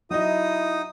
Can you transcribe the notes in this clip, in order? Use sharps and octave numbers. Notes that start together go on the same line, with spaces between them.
F#3 D#4 E4 D#5 D#6